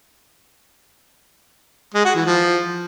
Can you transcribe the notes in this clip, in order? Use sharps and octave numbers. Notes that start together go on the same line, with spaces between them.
G#3
F#4
E3
F3